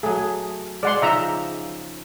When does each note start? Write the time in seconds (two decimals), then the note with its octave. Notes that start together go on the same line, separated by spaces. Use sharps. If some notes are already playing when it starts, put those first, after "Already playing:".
0.03 F#3 A3 G#4
0.83 G#3 D5 F#5 C6
1.02 C#3 F3 D#4 E5 A#5